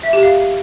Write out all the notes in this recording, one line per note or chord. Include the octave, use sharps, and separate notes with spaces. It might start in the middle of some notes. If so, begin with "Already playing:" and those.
E5
G4
F5